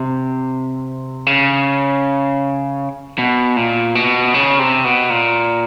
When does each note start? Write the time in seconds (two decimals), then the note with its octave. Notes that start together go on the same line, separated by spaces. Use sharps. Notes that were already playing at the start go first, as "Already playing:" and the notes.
Already playing: C3
1.26 C#3
3.18 B2
3.57 A#2
3.95 B2
4.34 C#3
4.59 C3
4.84 B2
5.10 A#2